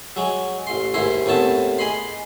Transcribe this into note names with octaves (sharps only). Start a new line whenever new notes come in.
F#3 G#3
A1 C6
D#2 G#2 E4 C6
D#2 A2 B3 C4 A5
G#4 D#5 B5 C6